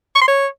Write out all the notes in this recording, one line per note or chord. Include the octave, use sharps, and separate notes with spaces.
C#6
C6
C#5